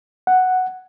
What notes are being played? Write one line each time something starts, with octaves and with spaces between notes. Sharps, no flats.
F#5